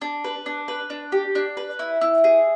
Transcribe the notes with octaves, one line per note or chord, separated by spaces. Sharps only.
D4
B4
D4
B4
D4
G4
D4
B4
E4
E4
G#4